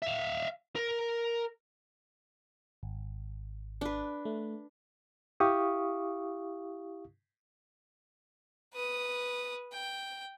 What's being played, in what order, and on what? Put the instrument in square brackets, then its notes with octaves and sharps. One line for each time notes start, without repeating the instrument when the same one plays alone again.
[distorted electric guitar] E5 F5
A#4
[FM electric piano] G#1
[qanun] D4 B4
[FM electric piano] A3
[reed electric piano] E4 G4 F5 C#6 D#6
[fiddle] B4 D#6
G5